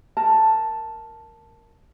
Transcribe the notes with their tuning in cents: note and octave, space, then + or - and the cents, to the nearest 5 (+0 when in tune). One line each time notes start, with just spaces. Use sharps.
A#4 +0 A5 +0